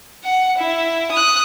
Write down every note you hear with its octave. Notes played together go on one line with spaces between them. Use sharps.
F#5
E4
D#6 F#6